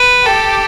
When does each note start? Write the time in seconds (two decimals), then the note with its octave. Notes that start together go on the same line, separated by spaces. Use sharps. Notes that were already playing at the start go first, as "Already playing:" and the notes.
Already playing: B4
0.26 G4 A4